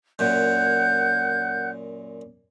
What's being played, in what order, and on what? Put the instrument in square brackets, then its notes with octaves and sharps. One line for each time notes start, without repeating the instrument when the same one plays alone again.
[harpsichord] F#2 A#2 [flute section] F#5 F#6 G6